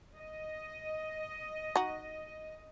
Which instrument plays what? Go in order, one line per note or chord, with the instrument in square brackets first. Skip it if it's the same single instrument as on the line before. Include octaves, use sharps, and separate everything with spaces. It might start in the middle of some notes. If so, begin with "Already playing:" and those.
[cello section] D#5
[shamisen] D#4 F#4